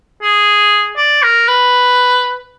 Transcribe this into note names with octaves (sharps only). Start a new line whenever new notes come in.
G#4
D5
A#4
B4